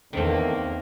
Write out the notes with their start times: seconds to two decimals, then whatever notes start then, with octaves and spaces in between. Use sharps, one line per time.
0.13 E2 D3 D#3 A3 A#3 C4